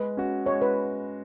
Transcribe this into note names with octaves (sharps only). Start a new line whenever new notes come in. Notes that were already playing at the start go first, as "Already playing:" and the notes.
Already playing: G#3 B4
C#4 F#4
G#3 C#5
B4